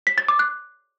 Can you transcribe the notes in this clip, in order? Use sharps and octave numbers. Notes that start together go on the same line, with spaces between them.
B6
A6
D6
F#6